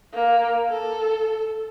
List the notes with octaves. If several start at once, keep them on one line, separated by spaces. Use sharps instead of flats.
A#3
A4